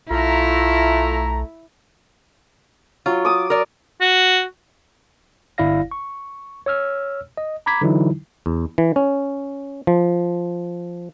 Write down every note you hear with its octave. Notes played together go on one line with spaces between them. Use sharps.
B1 A3 E4 F4 A#5
F#3 F4
D6 D#6
A#4 D5
F#4
G1 E4 D5 F5 A#6
C#6
C#5 E6 F6
D#5
A#5 B5 D6 G#6 B6
D3 E3 F#3 D#4 E4
E2
E3
C#4
F3